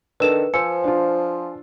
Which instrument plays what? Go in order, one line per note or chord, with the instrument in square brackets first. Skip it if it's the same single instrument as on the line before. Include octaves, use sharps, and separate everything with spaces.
[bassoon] D#3 [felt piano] D4 A4 [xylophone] B4 E6 E7
[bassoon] F3 [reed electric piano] C5 G#5 [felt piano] E6 [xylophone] C#7
[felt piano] D4 F4